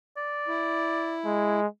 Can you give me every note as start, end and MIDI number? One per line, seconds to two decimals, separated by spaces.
0.17 1.16 74
0.48 1.60 64
1.25 1.67 56